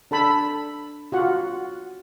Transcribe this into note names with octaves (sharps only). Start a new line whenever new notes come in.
D4 A4 A5 B5
F4 F#4 F#5